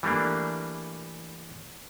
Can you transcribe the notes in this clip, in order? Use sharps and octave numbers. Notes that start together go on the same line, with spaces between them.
E3 G3 A3 A#3 D4